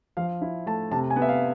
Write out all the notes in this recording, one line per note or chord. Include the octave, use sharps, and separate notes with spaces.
F3 F5
E4
A3 A5
C3 A5
G#5
B3
E5
F5